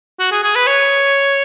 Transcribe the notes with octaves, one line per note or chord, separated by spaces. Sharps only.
F#4
G#4
G#4
B4
C#5